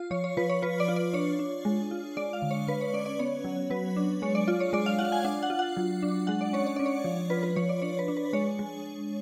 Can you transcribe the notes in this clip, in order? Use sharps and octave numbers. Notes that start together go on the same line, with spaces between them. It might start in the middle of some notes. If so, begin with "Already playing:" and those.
Already playing: F4
F3 C#5
C#5
F3 B4
C#5
F4 B4
D5
F4
D5
D4 C#5
D4
G#3
F4
G#3 D5
F5
D3
C#5
D3 B4
C#5
C#4 D5
D5
B3 C#5
F#3
F#3 B4
D4
G#3 C#5
D5
F4 D5
C#5
G#3 D5
F5
F4 F#5
G#5
D4
F#5
F4
F#5
F#3
D4
G#3 F#5
D5
C#4 C#5
C#5
C#4 D5
C#5
F3
F4 B4
B4
F3 C#5
D5
D4 C#5
B4
D4
B4
G#3 C#5
G#3